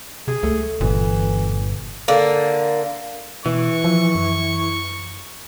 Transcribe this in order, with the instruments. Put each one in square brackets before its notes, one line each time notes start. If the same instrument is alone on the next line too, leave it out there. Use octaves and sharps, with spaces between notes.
[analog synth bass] C3 [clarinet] G#4
[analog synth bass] C#2 [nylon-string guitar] A3
[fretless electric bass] G1 [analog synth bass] A#2 [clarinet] E3
[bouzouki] D3 A#3
[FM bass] B2 [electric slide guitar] E3 [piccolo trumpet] C#6
[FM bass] F3
F#2